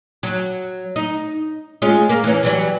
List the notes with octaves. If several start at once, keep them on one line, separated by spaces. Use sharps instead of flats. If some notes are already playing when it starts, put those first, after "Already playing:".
F#3
D#4
G#3 C#4 F4
A#3
E3 C#4
E3 F#3 G3